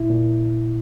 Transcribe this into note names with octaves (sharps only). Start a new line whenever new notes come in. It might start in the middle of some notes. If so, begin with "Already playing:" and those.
Already playing: A#2 E4
A#2